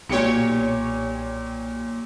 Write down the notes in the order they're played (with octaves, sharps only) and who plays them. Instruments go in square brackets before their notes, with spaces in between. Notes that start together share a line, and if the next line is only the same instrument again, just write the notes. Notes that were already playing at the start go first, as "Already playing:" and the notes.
[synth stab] B1 G4 C#5 [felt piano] A#2 C#7